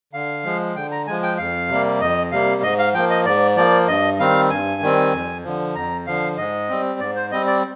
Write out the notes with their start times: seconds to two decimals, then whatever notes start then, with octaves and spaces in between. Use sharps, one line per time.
0.13 D3 F5
0.44 F3 G#3
0.75 D3 G5
0.92 A#5
1.07 F3 G#3 G#5
1.23 G5
1.38 F2 F5
1.69 C3 G3 A#3
2.01 F2 D#5
2.32 C3 G3 A#3 F5
2.63 G#2 D#5
2.79 F5
2.94 F3 A#3 G5
3.10 D#5
3.25 G#2 D5
3.57 F3 A#3 D5
3.88 G2 D#5
4.19 D#3 G3 C4 F5
4.50 G2 G#5
4.82 D#3 G3 C4
5.13 F2
5.44 D3 F3
5.75 F2 A#5
6.07 D3 F3 F5
6.38 G#2 D#5
6.69 G3 C4
7.00 G#2 D5
7.15 C5
7.31 G3 C4 D#5
7.47 D5